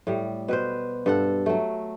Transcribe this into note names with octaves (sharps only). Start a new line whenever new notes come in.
A2 G3
B2 B4 C5
G2 A4 F#5
F#3 A3